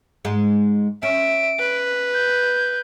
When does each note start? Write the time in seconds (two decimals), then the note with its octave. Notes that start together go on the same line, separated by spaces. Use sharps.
0.25 G#2 G#3
1.03 C#4 E5 D7
1.59 B4
2.14 G6